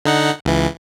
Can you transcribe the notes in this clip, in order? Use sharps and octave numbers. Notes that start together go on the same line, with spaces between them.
D3 D#4 F#5
C#2 E3